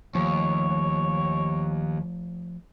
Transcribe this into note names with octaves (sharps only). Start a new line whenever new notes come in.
D#2 F3 A3 C#5